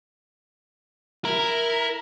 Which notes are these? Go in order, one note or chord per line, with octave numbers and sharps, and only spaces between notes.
E4 A#4